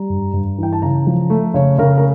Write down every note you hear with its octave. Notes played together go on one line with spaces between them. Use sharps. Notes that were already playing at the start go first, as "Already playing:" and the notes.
Already playing: G3 A#5
G2
G2
E3 G5
A5
C#3 A#5
F3
A3
C#3 C#5
C#3 A#4
A#4